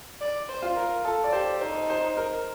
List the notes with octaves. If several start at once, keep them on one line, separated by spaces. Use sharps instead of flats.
D5
C5
F4
A#4
A4
D5
G4 C5
D#4 C5
C5
A#4